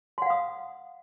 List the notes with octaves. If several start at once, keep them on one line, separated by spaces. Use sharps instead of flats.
F5 F#5 C6 D#6